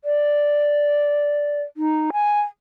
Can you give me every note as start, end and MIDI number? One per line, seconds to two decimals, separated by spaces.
0.04 1.62 74
1.77 2.11 63
2.13 2.40 80